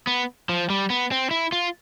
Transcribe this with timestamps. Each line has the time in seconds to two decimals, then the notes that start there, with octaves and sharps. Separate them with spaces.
0.07 B3
0.49 F3
0.70 G3
0.90 B3
1.11 C4
1.31 E4
1.52 F4